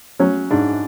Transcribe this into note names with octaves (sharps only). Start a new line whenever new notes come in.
F#3 C#4
G#2 D4